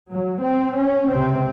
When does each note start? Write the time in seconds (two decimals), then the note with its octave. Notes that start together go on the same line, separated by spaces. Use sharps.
0.10 F#3
0.42 C4
0.76 C#4
1.09 C#2 C3 C4